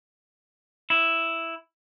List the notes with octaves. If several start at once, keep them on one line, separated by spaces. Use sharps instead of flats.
E4